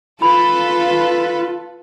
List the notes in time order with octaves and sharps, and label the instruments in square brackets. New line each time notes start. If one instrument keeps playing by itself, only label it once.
[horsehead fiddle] F4 [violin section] A4 B4 [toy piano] B5